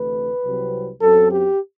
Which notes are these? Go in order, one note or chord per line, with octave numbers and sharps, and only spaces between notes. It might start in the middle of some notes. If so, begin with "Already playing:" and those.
Already playing: D2 C3 E3 A3 B4
C2 C3 F#3 C4
F#2 F#3 C4 A4
G4